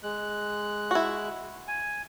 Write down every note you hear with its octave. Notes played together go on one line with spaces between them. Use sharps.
G#3 F#6
E4 F#4
G#5